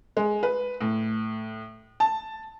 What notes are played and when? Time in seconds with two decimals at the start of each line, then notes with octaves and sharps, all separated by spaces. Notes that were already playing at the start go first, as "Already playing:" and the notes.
0.17 G#3
0.43 B4
0.81 A2
2.00 A5